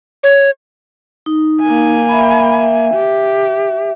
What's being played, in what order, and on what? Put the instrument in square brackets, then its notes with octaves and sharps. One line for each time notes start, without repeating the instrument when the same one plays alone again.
[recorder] C#5
[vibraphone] D#4
[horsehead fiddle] A#3 G#5
[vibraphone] E5 B5
E5
[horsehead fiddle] G4